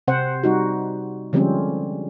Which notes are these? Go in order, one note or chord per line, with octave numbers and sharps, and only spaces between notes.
C3 C4 C5 F#5
G3 D#4 F#4
D3 F3 G3 G#3 C4 C#4